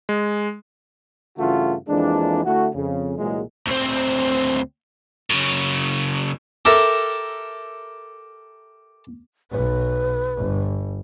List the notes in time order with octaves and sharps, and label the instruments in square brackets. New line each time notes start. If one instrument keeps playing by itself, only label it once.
[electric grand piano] G#3
[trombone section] G2 C#3 E3 A3 F4 F#4
F2 E3 G#3 A#3 D4
D3 A3 E4 F#4
F2 C#3
C2 A#2 E3 F#3 G#3
[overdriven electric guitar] D2 C4
F#2 C#3
[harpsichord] G4 A4 A#4 E5
[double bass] B1 [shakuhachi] B4
[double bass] G1